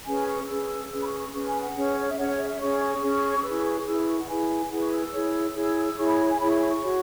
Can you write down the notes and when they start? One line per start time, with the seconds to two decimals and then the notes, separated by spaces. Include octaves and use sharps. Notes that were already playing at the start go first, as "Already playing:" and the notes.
0.06 C#4 G#4 B4 G#5
0.27 C#6
0.48 C#4 G#4 B4 E6
0.70 E6
0.91 C#4 G#4 B4 E6
1.00 B5
1.05 C#6
1.19 C#6
1.33 C#4 G#4 B4 C#6
1.47 G#5
1.61 F#5
1.75 C#4 G#4 C#5
2.01 C#5
2.09 E5
2.17 C#4 G#4 C#5 F#5
2.28 C#5
2.38 E5
2.48 E5
2.59 C#4 G#4 C#5 C#6
2.80 C#6
3.01 C#4 G#4 C#5
3.44 E4 G#4 B4 E6
3.65 C#6
3.86 E4 G#4 B4 E6
4.07 C#6
4.18 F#5
4.28 E4 G#4 B4 G#5
4.70 E4 G#4 B4 F#5
4.81 C#6
4.91 E6
5.02 E6
5.13 E4 G#4 C#5
5.55 E4 G#4 C#5
5.96 E4 G#4 C#5 C#6
6.07 B5
6.18 B5
6.29 G#5
6.39 E4 G#4 C#5 B5
6.49 C#6
6.60 C#6
6.70 C#6
6.81 F#4 C#5